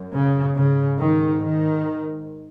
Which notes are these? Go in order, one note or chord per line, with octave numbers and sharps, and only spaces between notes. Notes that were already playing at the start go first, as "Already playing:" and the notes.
Already playing: F#2
C#3
G#2 C#3
D#3
D#3